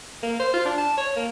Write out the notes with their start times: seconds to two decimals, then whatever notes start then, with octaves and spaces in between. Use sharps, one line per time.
0.23 A#3
0.40 C5
0.54 F4
0.65 D4
0.78 A5
0.97 C#5
1.16 A#3